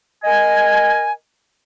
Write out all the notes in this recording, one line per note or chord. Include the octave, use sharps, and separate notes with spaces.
A#4 D#5 G#5